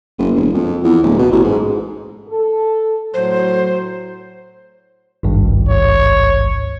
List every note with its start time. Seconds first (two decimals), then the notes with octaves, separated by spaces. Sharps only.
0.18 F#1
0.36 E1
0.54 F2
0.83 E2
1.03 D1
1.19 B2
1.31 A1
1.44 G#2
2.28 A4
3.14 A2 F#3 C5
5.23 G#1 C#2 G2
5.69 C#5